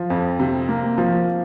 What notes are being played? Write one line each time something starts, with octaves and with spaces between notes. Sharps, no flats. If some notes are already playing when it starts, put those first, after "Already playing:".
Already playing: F3
F2
C3
A#3
F3